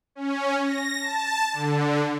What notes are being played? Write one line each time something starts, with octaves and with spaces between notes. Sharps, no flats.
C#4
A#6
A5
D3